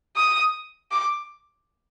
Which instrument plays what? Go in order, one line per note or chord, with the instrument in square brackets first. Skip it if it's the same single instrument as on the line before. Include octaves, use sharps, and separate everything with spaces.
[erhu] D#6
D6